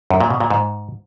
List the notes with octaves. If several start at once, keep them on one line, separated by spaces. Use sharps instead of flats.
F#2
A#2
B2
A#2
G#2